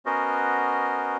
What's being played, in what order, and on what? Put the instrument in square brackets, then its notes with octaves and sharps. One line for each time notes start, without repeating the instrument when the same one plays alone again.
[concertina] B3 C#4 F#4 A#4 C5 D#5